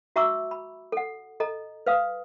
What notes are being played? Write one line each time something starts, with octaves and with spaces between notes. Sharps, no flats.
F#4 E5 A#5 C#6 D6 E6
B5
A4 F#5
A4 D#5 A#5
B4 F5 D#6